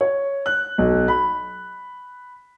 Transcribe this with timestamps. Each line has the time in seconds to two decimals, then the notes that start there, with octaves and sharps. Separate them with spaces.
0.01 C#5
0.46 F#6
0.78 B1
1.08 B5